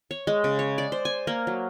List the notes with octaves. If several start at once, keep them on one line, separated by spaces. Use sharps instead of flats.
C#5
G#3
C#3
C#5
D5
C5
G#5
A#3
F#3